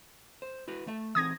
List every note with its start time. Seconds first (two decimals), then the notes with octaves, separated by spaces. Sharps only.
0.42 C5
0.68 E4 F#4 B4
0.87 A3 E5
1.15 E3 C4 D#4 D#6 G#6 A#6